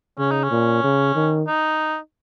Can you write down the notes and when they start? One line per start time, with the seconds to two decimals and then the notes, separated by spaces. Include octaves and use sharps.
0.19 C#3 C#4
0.31 D#4
0.44 C#4
0.51 A#2
0.84 C#3
1.15 D#3
1.48 D#4